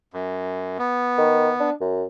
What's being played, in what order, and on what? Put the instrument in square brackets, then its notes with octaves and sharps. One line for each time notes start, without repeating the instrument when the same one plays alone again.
[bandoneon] F#2
B3
[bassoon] D#3
D4
F#2